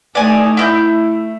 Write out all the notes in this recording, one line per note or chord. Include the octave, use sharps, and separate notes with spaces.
A3 D#4 D5 G#5
A3 E4 E6 G6